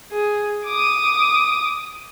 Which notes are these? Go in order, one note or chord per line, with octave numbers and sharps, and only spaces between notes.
G#4
D6 D#6